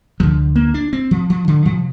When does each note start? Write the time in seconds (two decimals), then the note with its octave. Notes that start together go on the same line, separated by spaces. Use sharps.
0.20 D2 D3 F3
0.56 A#3
0.74 D4
0.93 C4
1.11 F3
1.30 F3
1.48 D3
1.65 C3 F3